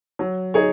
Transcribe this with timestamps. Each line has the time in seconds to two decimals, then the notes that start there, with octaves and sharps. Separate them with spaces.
0.19 F#3
0.54 D#4 G#4 C#5